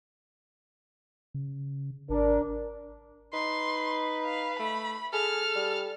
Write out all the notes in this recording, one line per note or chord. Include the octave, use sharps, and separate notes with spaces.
C#3
G#1 D4 A#4
D#4 B4 C6
F5
A3 B5
G#4 A4 F6
G3